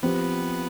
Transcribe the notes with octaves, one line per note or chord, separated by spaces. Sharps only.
F3 B3 C4 G4 B4